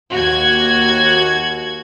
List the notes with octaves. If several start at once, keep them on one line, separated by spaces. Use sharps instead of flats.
D#2 F#4 G#6